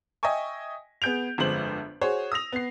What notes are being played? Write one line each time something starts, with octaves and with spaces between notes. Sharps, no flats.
D#5 E5 G5 G#5 C#6
B3 G#4 G6 D7 F7
G1 F2 G#3 C5 F#7
F#4 G#4 C5 C#5
D#6 E6 A#6 F7
B3 C7